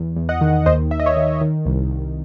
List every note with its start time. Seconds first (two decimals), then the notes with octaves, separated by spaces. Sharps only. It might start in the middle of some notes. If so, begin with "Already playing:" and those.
Already playing: E2
0.16 E2
0.29 D#5 F#5
0.41 D#3
0.66 D#2 C5 D#5
0.91 D#2 E5
1.00 D#5
1.06 C#5 E5
1.16 D#3
1.41 D#3
1.66 C2
1.91 C2